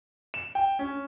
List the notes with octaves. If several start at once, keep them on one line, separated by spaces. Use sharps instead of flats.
E7
G5
C#4